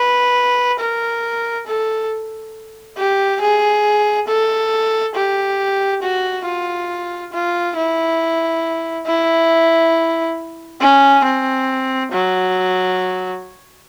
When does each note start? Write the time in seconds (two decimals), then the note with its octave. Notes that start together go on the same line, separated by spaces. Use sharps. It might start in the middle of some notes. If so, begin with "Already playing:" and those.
Already playing: B4
0.79 A#4
1.66 A4
2.97 G4
3.41 G#4
4.27 A4
5.15 G4
6.02 F#4
6.45 F4
7.33 F4
7.76 E4
9.07 E4
10.81 C#4
11.24 C4
12.11 F#3